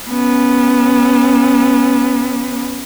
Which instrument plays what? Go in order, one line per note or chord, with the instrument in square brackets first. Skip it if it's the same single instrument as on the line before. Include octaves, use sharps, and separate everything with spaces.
[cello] B3 C#4